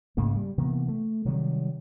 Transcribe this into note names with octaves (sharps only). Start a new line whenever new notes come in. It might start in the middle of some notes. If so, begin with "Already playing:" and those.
G#2 C#3 G#3 A#3
G3
C3 E3 A#3 B3
A3
C3 D#3 F#3 G3